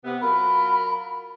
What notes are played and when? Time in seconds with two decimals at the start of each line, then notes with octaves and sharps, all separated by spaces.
0.05 C3 B3
0.22 F#3 F4 A#4 B5